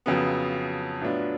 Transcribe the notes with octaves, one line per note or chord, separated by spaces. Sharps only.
F2 C#3 F#3 B3
A2 F#3 B3 D4 F4